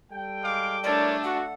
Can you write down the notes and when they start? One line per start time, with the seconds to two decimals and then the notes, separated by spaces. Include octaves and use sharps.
0.12 G3 A4 G5
0.43 G#3 F5 D6
0.84 A3 D4 E4 A#4 C#5 D5
1.23 F#4 F#5